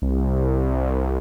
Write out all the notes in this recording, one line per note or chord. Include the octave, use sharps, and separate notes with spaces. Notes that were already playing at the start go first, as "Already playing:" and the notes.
C2